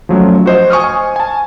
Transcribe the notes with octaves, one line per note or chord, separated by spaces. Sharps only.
F3 F#3 A3 C#4
F#4 C5 D#5
G#5 C#6 D#6 F6
G#5
G#5 A5